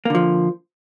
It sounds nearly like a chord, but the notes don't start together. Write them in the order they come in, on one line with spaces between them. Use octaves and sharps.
A#3 D3 F3